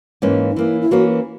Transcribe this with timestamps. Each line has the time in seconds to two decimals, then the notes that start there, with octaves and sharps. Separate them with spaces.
0.22 G#2 E3 A#3 C#4
0.51 D#4
0.56 E3 A#3 C#4 E4
0.81 E4
0.91 E3 A#3 C#4 F#4